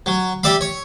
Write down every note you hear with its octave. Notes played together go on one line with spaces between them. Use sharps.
F#3
G3 D5 E5 B5
C#5